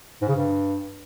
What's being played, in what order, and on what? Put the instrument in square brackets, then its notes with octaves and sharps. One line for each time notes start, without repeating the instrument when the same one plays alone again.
[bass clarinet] G#2
C#3
G2